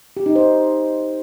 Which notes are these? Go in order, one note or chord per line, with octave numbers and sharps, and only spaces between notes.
G4
D#4
C5